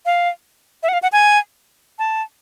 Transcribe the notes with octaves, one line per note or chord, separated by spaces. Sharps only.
F5
E5
F#5
F5
F#5
G#5
A5